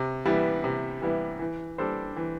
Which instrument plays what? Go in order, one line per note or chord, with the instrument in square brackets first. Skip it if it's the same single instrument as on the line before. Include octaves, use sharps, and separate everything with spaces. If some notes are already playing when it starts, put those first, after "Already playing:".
Already playing: [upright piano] C3
E3 G3 B3 E4
C3
E3 G3 B3 E4
E3
G3 D4 A4 C5
E3